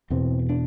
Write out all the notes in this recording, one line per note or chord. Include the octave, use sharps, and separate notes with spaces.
E2 B2 C4
D4